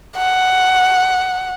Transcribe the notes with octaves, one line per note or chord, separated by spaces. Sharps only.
F#5